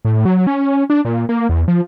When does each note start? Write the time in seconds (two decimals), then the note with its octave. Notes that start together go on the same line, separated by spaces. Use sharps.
0.05 A2
0.25 F#3
0.47 C#4
0.90 D4
1.05 A#2
1.29 A#3
1.49 E2
1.68 F3